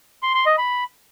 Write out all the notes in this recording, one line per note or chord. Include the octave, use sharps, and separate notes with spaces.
C6
C6
D#5
B5